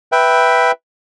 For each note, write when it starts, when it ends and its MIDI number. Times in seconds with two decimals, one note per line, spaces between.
0.12 0.72 71
0.12 0.72 76
0.12 0.72 79